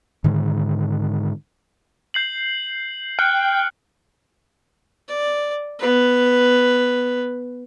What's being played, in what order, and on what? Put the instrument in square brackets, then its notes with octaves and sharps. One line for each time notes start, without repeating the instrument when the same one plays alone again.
[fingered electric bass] G#2 D3 D#3 G#3
[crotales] G6 C7 F#7
[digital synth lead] G5 [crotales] F6 F#6 C#7
[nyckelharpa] D5
B3 B4